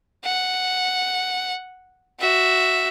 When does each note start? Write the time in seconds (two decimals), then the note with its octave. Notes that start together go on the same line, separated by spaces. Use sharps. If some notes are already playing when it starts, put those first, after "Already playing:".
0.24 F#5
2.20 F#4 E5